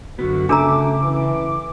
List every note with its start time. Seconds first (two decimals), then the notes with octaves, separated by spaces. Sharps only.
0.19 F#2 D3 B3 F#4
0.49 C#3 A3 D4 A#4 A#5 D6
1.02 E3